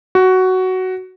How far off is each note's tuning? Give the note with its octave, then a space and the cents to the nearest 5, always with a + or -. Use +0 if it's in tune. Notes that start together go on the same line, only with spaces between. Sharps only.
F#4 +10